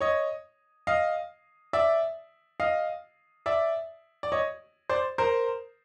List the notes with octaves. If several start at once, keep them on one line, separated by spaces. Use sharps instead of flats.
C#5 D#5
D#5 F5
D5 E5
D#5 F5
D5 E5
D5
C#5 D#5
C5 D5
A#4 C5